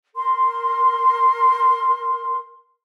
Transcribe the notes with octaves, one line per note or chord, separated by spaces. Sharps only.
A#4 C6